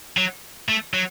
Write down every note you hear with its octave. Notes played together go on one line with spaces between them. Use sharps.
F#3
A3
F#3